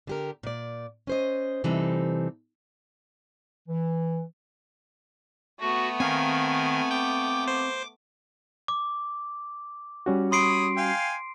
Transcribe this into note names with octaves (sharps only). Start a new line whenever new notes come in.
D3 G4 A#4
A#2 D5
C#4 C5 D#5
C3 E3 G3 C4 D#4 A4
E3
A3 B3 F#4
D#3 C4 F5 G#5 A#5
G5 D6
C5
D6
G3 C#4 F#4
C#5 B5 C6 D#6 C7 D7
F5 G5 G#5